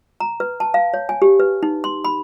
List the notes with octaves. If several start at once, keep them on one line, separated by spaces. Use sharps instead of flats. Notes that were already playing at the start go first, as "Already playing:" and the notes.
A#5
B4
A5
F5
C#5
G#5
G4
B4
D#4
C6
B5